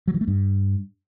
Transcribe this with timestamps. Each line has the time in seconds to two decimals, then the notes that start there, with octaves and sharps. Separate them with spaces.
0.08 F#3
0.14 E3
0.21 A3
0.28 G2